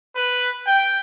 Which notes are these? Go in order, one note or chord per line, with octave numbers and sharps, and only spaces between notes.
B4
G5